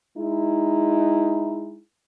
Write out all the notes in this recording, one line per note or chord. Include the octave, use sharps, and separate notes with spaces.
G#3 D#4 E4